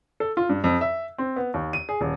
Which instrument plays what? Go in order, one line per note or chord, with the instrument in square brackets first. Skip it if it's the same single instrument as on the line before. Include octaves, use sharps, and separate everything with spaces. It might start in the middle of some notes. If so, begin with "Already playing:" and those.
[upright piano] A4
F4
G2
F2
E5
C4
B3
D#2
D#7
G#4
D#1